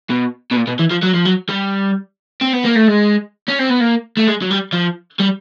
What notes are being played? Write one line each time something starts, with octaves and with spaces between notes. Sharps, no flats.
B2
B2
A#2
B2
E3
F3
F#3
F3
F#3
G3
C4
B3
A#3
A3
G#3
C#4
C4
B3
A#3
A3
G#3
F#3
G3
F3
G3